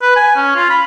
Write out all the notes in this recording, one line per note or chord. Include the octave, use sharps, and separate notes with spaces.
B4
G#5
C#4
F4
B5